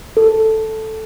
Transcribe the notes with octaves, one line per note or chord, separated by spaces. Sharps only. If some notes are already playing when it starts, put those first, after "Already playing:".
A4